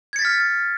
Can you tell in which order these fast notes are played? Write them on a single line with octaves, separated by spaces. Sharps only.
G#6 C#7 A6 B6 F6